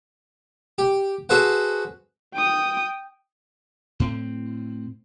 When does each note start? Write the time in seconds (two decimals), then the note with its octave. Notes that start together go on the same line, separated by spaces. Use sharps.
0.78 G4
1.29 F#4 G#4 A4 B4 C5 F#5
2.34 G5 D#6
4.00 A2 C4